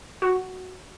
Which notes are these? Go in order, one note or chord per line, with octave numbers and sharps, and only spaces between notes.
F#4